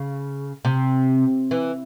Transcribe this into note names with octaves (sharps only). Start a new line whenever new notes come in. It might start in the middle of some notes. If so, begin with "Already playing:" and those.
Already playing: C#3
C3
E3